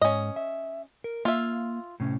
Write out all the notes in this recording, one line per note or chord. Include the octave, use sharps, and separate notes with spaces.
G#2 C#4 D#5
E5
A#4
A#3 F4 E5
A2 C3 C#4